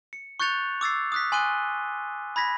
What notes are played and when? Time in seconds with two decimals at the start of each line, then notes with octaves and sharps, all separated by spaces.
0.13 C#7
0.40 C#6 F#6 G6 A6 C#7 F7
0.81 D6 E6 A6 C7
1.12 D#6 F#6 B6
1.32 G#5 C6 D#6 F#6 D#7 G7
2.36 B5 G#6 A#6 B6